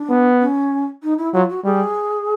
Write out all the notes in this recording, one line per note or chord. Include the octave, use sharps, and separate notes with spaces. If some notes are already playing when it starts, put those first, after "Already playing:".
Already playing: D4
B3
C#4
D#4
E4
F#3 F4
F#4
G3 G#4